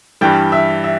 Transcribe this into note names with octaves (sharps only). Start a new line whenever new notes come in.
G2 E3 G3 G5
E5
E5